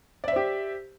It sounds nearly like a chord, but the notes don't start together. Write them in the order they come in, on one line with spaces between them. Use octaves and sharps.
D5 E5 C5 G4